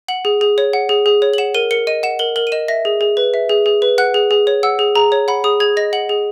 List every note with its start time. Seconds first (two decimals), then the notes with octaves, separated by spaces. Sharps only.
0.08 F#5 F#7
0.25 G#4
0.41 G#4
0.58 C#5
0.73 F#5
0.89 G#4
1.06 G#4
1.22 C#5
1.34 F#7
1.38 F#5 E7
1.54 A#4 D#7
1.71 A#4 C#7
1.87 D#5 D#7
2.03 F#5 E7
2.19 A#4 F#7
2.36 A#4 F#7
2.47 D#7
2.52 D#5 E7
2.68 E5 A#6
2.85 G#4
3.01 G#4
3.17 B4
3.34 E5
3.49 G#4
3.66 G#4
3.82 B4
3.98 F#5 F#6
4.14 G#4
4.31 G#4
4.47 C#5
4.63 F#5 E6
4.79 G#4
4.95 G#4 A#5
5.12 C#5
5.28 F#5 B5
5.44 G#4 D#6
5.60 G#4 G#6
5.77 D#5 A#6
5.93 F#5 F#7
6.09 G#4